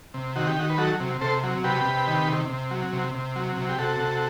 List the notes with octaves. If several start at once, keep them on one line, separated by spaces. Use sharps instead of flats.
C3
D#3 F#4
G4
D#3 F#4
B4
F#3 F#4 A4
C3
C3 A4 C5
F#3
C3 G4 B4
C3
D#3
C3
C3
F#3
C3
C3
F#3
C3
G4
C3 F#4 A4
C3